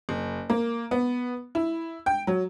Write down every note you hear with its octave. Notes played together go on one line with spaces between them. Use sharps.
F#1
A#3
B3
E4
G5
F#3